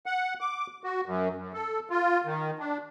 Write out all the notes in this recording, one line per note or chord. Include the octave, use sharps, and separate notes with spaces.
F#5
D6
F#4
F#2
F#2
A4
F4
D#3
D4